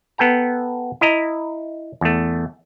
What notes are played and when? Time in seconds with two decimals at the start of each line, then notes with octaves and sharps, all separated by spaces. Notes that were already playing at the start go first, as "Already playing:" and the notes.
0.18 B3 A4 G5 A#5
1.01 E4 D#5 A#5
2.01 E2 A3